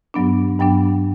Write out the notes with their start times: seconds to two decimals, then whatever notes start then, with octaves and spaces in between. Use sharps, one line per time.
0.14 G2 F#3 B3 D4
0.60 G2 F#3 B3 D4 G5